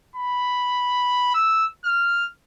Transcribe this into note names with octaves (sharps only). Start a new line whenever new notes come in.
B5
E6
F6